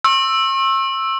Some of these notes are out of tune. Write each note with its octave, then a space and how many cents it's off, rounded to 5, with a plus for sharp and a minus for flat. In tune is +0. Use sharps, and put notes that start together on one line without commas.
C#6 -45 E6 +0